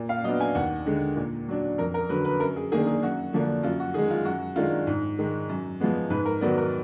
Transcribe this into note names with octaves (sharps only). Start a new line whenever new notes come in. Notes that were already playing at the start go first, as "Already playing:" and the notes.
Already playing: A#2
F5
F#3 B3 D4 D#5
G#5
D#2 F#5
D3 G#3
A#2
F#3 D4
F2 A#4
A#4
D3 F#3 B4
B4
F#2 A#4
G#4
D#3 A#3 D4 G#4
G#4
F#2 F#4
D3 F3 A#3 D4
F#2 F4
F#4
D#3 G#3 G#4
F4
F#2 F#4
D#3 G#3 D4 F4
G#2
D#3 G#3
F#2
F3 G#3 B3
G#2 B4
A#4
D#3 F#3 B3 D5
A#4